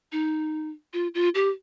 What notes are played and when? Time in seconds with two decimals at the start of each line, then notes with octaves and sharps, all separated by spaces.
0.12 D#4
0.93 F4
1.15 F4
1.35 G4